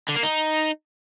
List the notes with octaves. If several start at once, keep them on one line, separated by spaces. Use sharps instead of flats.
D3
A#3
D#4